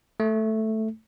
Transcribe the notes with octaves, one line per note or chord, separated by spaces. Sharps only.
A3